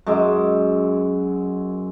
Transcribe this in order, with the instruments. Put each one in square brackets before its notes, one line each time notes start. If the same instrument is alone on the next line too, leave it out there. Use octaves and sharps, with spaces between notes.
[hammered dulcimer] F#2 G#3 E5 D6